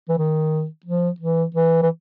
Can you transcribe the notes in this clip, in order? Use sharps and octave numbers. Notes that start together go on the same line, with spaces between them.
E3
D#3
F3
E3
E3
E3